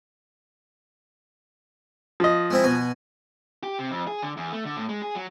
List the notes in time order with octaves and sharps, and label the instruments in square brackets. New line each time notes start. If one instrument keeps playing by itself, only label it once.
[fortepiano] F3 D#5
[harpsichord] G#3 C4 E4
B2 G#5
[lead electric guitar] G4
C3
F2
G#4
D3
E2
A3
D3
A2
G#3
G#4
F#3